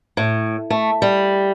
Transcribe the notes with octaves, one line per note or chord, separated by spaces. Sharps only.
A2
A3
G3